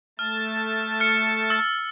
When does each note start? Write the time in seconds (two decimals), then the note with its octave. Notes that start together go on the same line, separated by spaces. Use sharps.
0.19 A3 A5 F6
1.00 F6 C#7
1.50 E6 A6